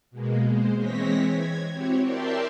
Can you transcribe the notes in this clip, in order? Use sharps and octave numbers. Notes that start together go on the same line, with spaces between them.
B2 G#3 A#3
G#3 C5
E3 G#3 C4 C#5 A#6 B6
G#6
C4 E4 F#4 G4 C#5
A#4 D5 E5 G5 A5 C6